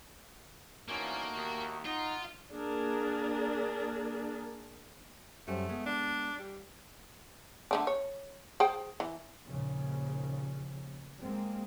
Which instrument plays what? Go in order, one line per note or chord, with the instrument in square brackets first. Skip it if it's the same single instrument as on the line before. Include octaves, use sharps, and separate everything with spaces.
[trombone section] A#2 E3 C#4 [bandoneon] A3 D#4 F#4 [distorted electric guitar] A#3
[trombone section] D#2
[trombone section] D#4 [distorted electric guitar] F4 [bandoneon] F#5 F#6
[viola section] A#3 D4 G#4 A#4
[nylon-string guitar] F#2 G3 C5 [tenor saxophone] A3
[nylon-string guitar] G#3 B3
[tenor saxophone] D4
G3
[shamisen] D3 A3 D4
C#5
G#4 C5 G5
E3
[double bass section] D#2 A#2 C#3 F3
G#3 A#3 C4